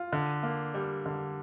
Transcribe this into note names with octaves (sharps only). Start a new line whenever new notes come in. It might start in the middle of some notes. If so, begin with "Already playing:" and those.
Already playing: F4
D3
A#3
G3
D3